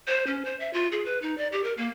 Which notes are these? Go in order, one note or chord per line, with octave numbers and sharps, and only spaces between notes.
C5
C#4
C5
E5
F4
G#4
B4
D#4
D5
G4
A#4
A#3